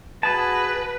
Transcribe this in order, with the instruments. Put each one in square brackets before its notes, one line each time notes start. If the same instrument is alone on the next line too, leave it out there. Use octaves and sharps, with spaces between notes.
[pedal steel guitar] F#4 G#4 A5 [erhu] B4